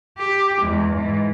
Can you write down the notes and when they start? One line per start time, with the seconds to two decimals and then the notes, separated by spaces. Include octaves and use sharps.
0.18 G4
0.61 E2 G#3
0.94 G#2 E3